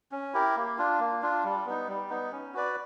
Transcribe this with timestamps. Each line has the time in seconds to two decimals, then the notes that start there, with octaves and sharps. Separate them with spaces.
0.12 C#4
0.33 E4 G4 A#4
0.56 A#3
0.78 D4 F4
1.00 A#3
1.22 D4 F4
1.44 G3
1.66 B3 D#4
1.88 G3
2.10 B3 D#4
2.32 C#4
2.54 F#4 B4 D5